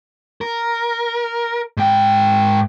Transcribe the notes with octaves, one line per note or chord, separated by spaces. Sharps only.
A#4
G#2 G5